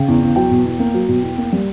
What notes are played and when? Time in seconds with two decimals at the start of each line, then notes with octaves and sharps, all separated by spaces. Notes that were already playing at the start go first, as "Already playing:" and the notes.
Already playing: C#3 G5
0.08 E2
0.22 E2
0.36 F#3 G5
0.51 B2
0.65 E2
0.80 A#3
0.94 F#3
1.09 B2
1.22 E2
1.38 A#3
1.52 G3